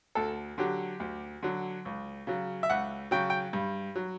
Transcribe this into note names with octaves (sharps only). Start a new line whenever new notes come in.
D2 A4
D3 F#3 G4
D2
D3 F#3
C#2
C#3 F#3
E5
C#2 F#5
C#3 F#3 G5
G5
G2
F#3